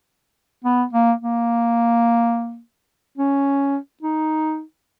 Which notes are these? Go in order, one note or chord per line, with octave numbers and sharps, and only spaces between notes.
B3
A#3
A#3
C#4
D#4